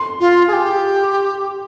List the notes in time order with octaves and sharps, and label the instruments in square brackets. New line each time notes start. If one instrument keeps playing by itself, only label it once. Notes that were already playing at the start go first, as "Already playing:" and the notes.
Already playing: [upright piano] C6
[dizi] F4
G#4
G4